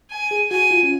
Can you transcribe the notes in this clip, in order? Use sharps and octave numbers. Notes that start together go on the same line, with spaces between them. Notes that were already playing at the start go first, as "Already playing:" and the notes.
G#5
G#4
F#4 G#5
F4
C#4